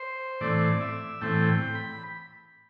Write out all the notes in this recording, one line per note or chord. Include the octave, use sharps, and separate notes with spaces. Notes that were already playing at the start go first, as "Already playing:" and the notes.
Already playing: C5
A2 E3 A3 C4 D5
E5
A2 E3 A3 C4 G5
G5
B5